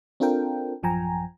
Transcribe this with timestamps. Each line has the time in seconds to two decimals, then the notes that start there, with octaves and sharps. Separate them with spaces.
0.20 C4 D4 F4 A4 A#4 G5
0.83 A1 F#2 F3 G5 G#5 A#5